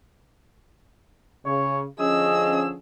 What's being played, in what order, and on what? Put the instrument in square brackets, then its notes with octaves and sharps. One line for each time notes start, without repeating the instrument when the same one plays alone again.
[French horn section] C#3 [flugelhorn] C#5
[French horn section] D3 F3 C#4 [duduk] G#4 [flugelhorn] D#5 [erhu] E6